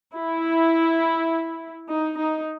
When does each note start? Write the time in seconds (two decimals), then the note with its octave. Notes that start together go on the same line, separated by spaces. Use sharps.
0.15 E4
1.88 D#4
2.17 D#4